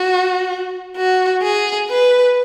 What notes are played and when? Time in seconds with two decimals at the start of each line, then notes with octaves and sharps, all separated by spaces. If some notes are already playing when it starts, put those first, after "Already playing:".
Already playing: F#4
0.97 F#4
1.42 G#4
1.90 B4